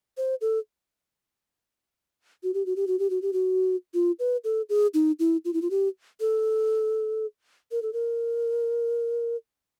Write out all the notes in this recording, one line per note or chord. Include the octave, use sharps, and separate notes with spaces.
C5
A4
F#4
G4
F#4
G4
F#4
G4
F#4
G4
F#4
F4
B4
A4
G#4
D#4
E4
F4
E4
F4
G4
A4
A#4
A4
A#4